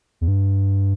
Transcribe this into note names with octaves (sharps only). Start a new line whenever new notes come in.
E2
G2